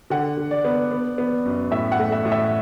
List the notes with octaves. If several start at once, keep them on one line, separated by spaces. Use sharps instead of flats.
D3 F#5
D3
D5
B3
B3
B3
F#2
A2 E5
F#5
A3
E5
A2
E5